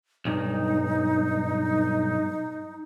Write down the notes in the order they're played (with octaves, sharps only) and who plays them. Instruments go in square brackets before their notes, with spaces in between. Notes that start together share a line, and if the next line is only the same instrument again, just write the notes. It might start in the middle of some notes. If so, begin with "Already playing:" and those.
[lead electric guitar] B1 G2 [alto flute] D#4